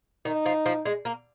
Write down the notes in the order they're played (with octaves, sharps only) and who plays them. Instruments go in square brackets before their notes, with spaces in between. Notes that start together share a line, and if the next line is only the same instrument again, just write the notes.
[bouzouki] D#3 [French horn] D#4
[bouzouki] F3
F3
G#3
A#3